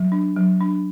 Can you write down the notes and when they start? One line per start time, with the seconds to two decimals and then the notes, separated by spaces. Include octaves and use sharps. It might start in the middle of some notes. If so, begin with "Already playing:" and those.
Already playing: F#3
0.12 D4
0.36 F#3
0.61 D4